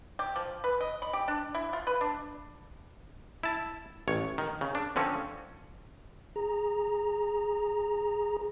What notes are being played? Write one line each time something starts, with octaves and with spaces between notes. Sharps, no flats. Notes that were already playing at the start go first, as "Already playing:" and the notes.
G4
F3
B4
D#5
B5
G4
D4
E4
F4
B4
D4
E4 A5
A1 C#5
D#3
C#3
D4
D3 F3 C4 C#4
G#4 A#5